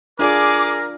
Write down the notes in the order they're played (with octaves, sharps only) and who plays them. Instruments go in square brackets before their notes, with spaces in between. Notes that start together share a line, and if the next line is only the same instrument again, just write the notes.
[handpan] D4 F4 D5 [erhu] G#4 [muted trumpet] A#4 [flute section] D6